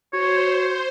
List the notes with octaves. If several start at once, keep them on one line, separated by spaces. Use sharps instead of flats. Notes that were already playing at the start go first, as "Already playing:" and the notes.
F#4 C5 C#5